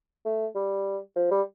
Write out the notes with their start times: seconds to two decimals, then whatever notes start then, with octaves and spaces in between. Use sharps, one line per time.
0.26 A3
0.55 G3
1.16 F3
1.31 G3